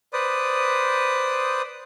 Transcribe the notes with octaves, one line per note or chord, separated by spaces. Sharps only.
B4 C5 D5 D#6